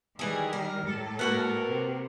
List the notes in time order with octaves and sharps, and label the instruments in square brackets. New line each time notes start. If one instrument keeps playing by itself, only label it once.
[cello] D#3 G3 [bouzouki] E3 G#4
[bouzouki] A#4
[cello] A2 A4
[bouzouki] A#3 F#4 B4 [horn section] A#4
[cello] C3